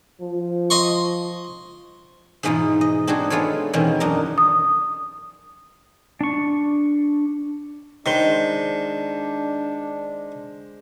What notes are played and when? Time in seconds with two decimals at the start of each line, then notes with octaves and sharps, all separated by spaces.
0.22 F3
0.70 D#5 C6 C#6
2.43 G#2 B2 E3 G#3 D#4 F4
2.81 D#5
3.07 C4 D4 D#4 F#4 G#4
3.30 G#3 B3 F4 A4 C#5
3.73 E2 B2 D#3 C4 C#4
4.00 F#2 D4 D#4 A#4
4.38 D#6
6.21 D4 C#6
8.06 D#3 G#3 D4 C5 G7